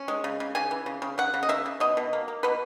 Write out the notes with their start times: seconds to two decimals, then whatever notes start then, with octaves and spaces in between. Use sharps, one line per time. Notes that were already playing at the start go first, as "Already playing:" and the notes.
Already playing: C#4
0.08 G#3
0.24 C#3
0.40 C#3
0.55 C#3 G#5
0.71 E3
0.86 C#3
1.02 C#3
1.18 C#3 F#5
1.34 C#3
1.43 D#5
1.49 C#3 E5
1.66 C#3
1.80 B2 D#5
1.97 B2
2.13 A#3
2.28 A#3
2.43 B2 B4